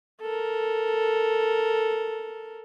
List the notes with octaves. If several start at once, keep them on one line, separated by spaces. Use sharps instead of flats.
A4 A#4